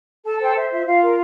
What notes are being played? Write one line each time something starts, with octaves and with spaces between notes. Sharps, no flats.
A4 A5
C5 G5
C5 E5
F4 E5
F4 F5
A#4